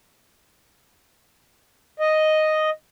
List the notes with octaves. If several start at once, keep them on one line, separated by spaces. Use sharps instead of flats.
D#5